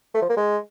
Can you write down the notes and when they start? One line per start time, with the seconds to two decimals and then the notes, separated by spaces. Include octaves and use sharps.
0.15 A3
0.22 F3
0.29 A#3
0.37 G#3